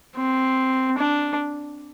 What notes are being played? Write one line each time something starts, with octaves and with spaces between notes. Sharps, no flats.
C4
D4